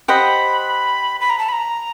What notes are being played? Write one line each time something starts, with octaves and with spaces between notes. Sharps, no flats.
G4 C5 D#5 F#5 B5
B5
A#5
A5
B5
A#5